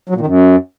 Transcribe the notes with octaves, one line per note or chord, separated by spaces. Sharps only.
F#3
A#2
D#3
F#2